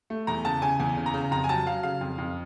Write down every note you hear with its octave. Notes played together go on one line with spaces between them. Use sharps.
A3
E2 A#5
C#3 A5
C#3 G#5
E2 G#5
C#3
A#5
C#3
F2 A#5
G#5
F#3 A5
F#3 F5
C#3 F5
F2
F2